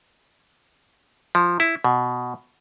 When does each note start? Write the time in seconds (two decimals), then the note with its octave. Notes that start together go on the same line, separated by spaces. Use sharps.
1.35 F3
1.60 E4
1.84 B2